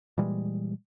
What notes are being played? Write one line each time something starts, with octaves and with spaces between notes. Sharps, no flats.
A#2 E3 G3 G#3